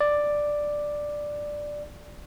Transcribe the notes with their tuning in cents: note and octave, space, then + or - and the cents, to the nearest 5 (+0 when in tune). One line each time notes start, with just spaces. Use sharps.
D5 +5